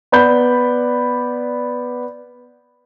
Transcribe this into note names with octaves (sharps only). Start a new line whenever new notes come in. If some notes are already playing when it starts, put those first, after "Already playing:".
B3 D5 B5 G6